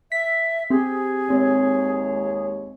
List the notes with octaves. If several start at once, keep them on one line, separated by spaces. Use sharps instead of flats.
E5 B6
C4 G4 G#4
D#2 G#3 C4 C#5